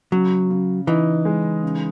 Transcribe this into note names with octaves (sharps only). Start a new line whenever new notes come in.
C#3 F#3
C#3
E3 D#4
G#3
C#3